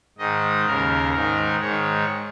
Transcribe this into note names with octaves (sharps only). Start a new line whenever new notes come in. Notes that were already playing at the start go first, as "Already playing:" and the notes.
G#2 D#3 D#5
D#2 C#3 A#4
G#2 D#3 A#4
G#2 D#3 C#5